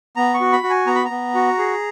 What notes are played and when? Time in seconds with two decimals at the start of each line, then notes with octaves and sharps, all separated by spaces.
0.16 B3 A#5
0.34 C#6
0.41 F#4
0.53 B5
0.63 F#4
0.70 G#5
0.87 B3 A#5
0.95 B5
1.05 A#5
1.10 B3
1.35 F#4
1.58 G#4